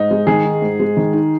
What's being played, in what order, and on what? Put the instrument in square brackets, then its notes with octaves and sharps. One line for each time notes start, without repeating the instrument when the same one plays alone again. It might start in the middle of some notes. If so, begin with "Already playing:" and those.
Already playing: [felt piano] G#2 [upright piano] D#4
[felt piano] G#3
[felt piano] D#3 [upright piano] G#4
[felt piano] D#4
G#2
G#3
D#3
D#4